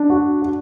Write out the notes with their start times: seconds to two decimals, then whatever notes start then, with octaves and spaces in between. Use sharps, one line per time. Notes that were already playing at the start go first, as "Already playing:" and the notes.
Already playing: D4
0.10 F#4
0.42 F#4